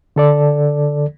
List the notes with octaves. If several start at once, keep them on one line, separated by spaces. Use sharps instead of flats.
D3 A4 D5